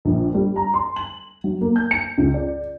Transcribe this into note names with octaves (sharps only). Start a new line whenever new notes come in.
A#1
G3
A#5
C6
F#7
F#3
A#3
G6
C#7
C#2
D5